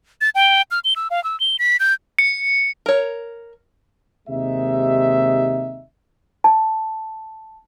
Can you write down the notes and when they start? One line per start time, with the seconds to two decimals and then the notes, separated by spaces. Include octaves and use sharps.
0.21 A6
0.35 G5
0.71 F6
0.84 G7
0.96 E6
1.11 F5
1.24 E6
1.40 G7
1.59 B6
1.80 G6
2.19 C#7
2.86 A#4 C#5
4.28 D#2 C3 G#3 D#4 E5
6.44 A5